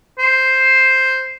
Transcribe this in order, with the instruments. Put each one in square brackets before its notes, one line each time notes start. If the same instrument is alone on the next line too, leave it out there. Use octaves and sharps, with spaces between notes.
[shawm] C5